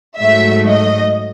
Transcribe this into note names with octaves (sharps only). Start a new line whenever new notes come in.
G#2 F#3 A3 E5
D#5